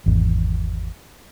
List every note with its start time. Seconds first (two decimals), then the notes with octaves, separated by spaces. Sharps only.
0.06 G#1 E2